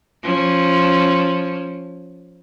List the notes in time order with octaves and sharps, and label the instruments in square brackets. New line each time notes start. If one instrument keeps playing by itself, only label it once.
[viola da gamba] F3 C#4